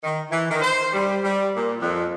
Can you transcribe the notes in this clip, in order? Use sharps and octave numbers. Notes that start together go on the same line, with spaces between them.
D#3
E3
D#3
C5
G3
G3
A#2
F2